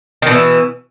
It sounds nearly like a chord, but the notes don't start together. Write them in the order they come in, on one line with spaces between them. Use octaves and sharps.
D#3 B2 E3